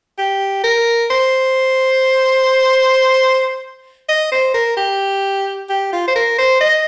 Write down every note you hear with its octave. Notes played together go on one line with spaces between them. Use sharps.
G4
A#4
C5
D#5
C5
A#4
G4
G4
F4
C5
A#4
C5
D#5